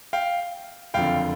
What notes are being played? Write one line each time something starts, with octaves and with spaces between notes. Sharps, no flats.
F5 G5
F#1 F2 D3 F5 G5